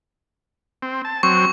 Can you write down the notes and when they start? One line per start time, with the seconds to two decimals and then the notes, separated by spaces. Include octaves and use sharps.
0.82 C4
1.05 A5
1.23 F#3 C4 C#6